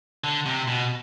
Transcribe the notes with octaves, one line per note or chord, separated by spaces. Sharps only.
D3
C3
B2